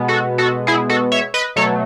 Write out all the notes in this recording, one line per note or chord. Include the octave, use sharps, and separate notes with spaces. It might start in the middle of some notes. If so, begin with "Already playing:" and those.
Already playing: B2 G#3 B3
F#4 A4
F#4 A4
E4 G#4
F#4 A4
C#5 E5
B4 D#5
B2 F#3 A3 A4 C#5